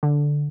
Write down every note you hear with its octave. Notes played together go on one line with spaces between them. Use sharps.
D3